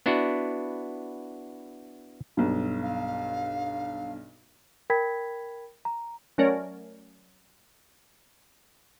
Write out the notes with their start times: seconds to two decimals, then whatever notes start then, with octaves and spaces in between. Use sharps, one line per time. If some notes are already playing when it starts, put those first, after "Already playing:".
0.06 B3 D4 E4 F#4
2.37 B1 G2
2.82 F5
4.90 A#4 G5 B5 G#6 B6
5.85 A#5
6.38 F#3 A3 C#4 A#4 C#5 D5